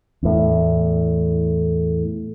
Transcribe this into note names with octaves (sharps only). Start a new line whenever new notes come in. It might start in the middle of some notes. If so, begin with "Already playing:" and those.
E2 A2